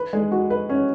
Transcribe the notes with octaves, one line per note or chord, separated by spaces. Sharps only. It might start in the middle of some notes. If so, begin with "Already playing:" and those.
Already playing: B4
G#3
F#4
B4
C#4